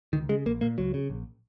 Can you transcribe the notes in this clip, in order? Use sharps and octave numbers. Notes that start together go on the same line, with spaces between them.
C#2 D#3
C#3 G#3
A#1 A#3
A#2 A#3
C#2 F#3
C#3
A#1